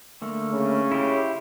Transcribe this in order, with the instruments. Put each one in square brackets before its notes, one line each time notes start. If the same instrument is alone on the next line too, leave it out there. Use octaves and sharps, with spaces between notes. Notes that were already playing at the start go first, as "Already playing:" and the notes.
[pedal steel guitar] D3 A3 A#3
[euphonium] C#3
[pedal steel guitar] E4 F4 G4